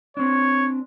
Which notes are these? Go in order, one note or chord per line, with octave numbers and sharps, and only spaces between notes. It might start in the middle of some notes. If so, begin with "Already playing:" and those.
C4 D4 C#5